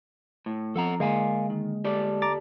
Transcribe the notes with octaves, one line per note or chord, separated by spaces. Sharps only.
A2
F3 C4 A4 F#5 A#5
D3 G#3 A#3 A#4 F5 G#5
D#3
G4 A4 D5
A#5 D6 A6